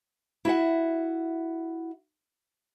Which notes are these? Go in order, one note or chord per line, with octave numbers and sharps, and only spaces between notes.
E4 F#4 E5 F#5